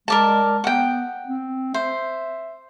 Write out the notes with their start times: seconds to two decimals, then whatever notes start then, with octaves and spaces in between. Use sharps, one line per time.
0.08 G#3 A#4 D5 A5
0.64 B3 F#5 G5
1.28 C4
1.74 C5 E5